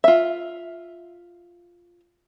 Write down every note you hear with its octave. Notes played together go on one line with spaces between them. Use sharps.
F4 E5